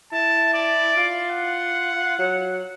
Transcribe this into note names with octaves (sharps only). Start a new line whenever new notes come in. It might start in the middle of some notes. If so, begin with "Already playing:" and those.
E4 A5
D5
F4
F#5
F#3